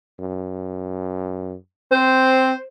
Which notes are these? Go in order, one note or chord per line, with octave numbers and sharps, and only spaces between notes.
F#2
C4 C5